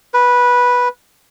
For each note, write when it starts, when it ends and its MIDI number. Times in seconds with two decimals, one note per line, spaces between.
0.14 0.88 71